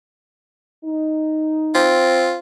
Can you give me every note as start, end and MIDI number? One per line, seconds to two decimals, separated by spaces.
0.85 1.98 63
1.75 2.37 60
1.75 2.38 65